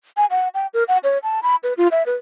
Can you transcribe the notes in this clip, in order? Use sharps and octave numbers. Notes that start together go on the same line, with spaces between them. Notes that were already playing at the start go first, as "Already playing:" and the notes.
G#5
F#5
G5
A#4
F#5
C#5
A5
B5
B4
F4
E5
B4